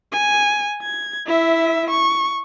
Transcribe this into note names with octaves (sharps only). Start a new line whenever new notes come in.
G#5
G#6
E4 E5
C#6